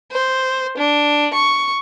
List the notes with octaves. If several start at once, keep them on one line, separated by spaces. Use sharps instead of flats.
C5
D4
C#6